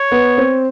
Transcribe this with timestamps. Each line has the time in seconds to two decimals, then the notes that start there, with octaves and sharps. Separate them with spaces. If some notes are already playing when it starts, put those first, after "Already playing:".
Already playing: C#5
0.12 B3
0.37 C4